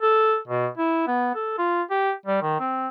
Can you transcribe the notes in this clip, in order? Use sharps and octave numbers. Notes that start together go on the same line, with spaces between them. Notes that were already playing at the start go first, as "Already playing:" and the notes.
A4
B2
E4
B3
A4
F4
G4
G3
D#3
C4